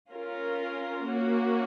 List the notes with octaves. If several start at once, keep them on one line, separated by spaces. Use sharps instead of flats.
C#4 F4 A#4
A#3 C#4 F#4